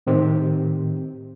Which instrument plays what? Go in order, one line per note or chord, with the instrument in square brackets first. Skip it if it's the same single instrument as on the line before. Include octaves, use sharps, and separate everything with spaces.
[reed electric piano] A2 D#3 C4 G4